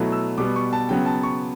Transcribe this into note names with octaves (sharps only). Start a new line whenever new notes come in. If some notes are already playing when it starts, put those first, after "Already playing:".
Already playing: B2 F#3 A3 E4
E6
B2 G3 B3 D6
C#6
A5
C#3 F#3 B3 G5
A5
C#6